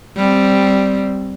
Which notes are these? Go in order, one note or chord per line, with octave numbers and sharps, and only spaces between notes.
G3 C4